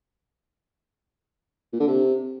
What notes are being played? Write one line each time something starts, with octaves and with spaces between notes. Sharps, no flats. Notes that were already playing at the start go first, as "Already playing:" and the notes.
A#2
D3
C3